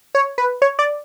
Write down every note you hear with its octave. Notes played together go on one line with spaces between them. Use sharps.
C#5
B4
C#5
D5